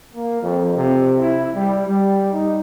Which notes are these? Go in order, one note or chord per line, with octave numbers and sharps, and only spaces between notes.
A#3
F2
C3
E4
G3
G3
D#4